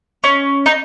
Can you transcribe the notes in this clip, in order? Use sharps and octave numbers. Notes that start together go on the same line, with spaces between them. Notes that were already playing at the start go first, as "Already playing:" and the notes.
C#4
D#4